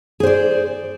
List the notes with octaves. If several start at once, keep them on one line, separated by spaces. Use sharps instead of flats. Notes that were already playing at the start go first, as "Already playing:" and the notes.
G#4 C5 D5